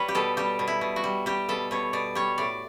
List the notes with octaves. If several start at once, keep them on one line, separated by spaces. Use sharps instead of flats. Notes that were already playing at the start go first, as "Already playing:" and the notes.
Already playing: G3 B4 C#5
G4
B2 A4
G3 G4
B2
E4
B2
F#4
G3
G3 G4
B2 A4
B2 C#5
B2 D5
G3 C#5
A2 D5